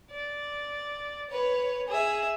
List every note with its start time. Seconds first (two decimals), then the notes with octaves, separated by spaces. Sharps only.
0.11 D5
1.30 B4 C#5
1.88 G#4 E5